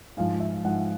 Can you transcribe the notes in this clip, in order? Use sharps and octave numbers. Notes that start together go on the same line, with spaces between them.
G#2 F3 F5
E5
G#2 F3 F#5